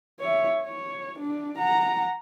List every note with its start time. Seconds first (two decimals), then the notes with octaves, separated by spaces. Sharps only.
0.20 C#5 E5
0.62 C#5
1.19 D4
1.58 F#5 A#5